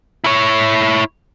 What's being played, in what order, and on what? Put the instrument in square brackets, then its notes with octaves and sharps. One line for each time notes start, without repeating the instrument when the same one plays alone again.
[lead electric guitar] E4 C#5